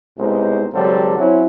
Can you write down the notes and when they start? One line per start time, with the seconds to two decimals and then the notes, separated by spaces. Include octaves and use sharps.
0.18 C2 B2 G#3 C#4 D#4 C5
0.73 G#1 C#3 F#3 G3 A4 C5
1.18 F#3 C4 C#4 E4